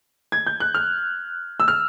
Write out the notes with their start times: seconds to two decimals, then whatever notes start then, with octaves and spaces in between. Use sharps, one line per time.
0.32 G#6
0.47 G6
0.60 F#6
0.75 F6
1.60 E6
1.68 F6